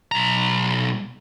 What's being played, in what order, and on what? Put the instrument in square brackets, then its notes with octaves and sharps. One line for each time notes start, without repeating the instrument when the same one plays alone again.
[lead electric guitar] B1 A#5